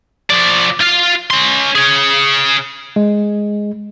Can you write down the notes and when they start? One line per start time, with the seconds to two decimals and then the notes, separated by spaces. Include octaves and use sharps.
0.30 F3 D5
0.81 F4 F5
1.31 C#4 C6
1.75 G#4 C#5
2.96 G#3